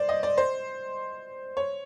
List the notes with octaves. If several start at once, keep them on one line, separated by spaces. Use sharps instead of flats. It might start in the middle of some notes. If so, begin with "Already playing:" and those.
Already playing: C5 D5
D#5
D5
C5
C#5